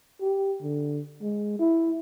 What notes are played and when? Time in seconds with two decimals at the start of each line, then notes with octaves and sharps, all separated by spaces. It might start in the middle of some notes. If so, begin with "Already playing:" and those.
0.21 G4
0.62 D3
1.22 G#3
1.59 E4